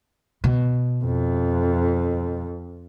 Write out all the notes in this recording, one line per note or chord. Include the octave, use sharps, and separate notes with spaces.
B2
F2